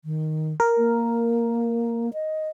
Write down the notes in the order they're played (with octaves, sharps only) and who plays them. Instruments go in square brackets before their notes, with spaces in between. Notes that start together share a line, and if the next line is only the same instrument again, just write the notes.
[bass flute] D#3
[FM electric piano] A#4
[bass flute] A#3
D#5